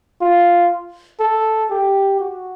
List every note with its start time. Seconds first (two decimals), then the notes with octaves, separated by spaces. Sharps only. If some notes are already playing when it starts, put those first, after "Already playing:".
0.21 F4
1.20 A4
1.71 G4
2.20 F#4